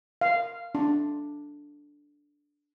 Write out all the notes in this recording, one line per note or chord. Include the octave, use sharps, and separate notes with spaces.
F5
D4